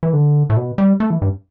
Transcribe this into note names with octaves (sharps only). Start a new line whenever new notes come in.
E3
D3
A2
B2
G3
A3
E3
G2